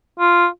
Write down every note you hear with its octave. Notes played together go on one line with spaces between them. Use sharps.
F4